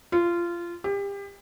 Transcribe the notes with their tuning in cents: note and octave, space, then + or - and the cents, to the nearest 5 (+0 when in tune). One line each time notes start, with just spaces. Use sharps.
F4 -20
G4 +30